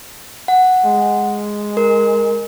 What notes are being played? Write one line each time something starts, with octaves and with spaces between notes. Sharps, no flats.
F#5
G#3
A#4